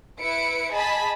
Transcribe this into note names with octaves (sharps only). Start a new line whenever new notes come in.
E4 B4 C#7 D7
G#4 D#5 G#5 A5 B5